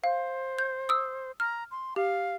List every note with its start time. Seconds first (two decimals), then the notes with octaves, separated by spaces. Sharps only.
0.04 C5 F5
0.59 G6
0.89 D#6 E6
1.40 A#5 F6
1.71 C6
1.96 G4 F5